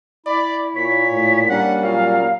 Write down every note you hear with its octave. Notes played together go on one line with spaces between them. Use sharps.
E4 D5 B5
A#2 C#5 B6
A2
G3 A#3 C#4 D4 F#5
A#2 F#3 F5